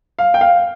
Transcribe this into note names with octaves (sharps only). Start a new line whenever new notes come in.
F5
G5
F5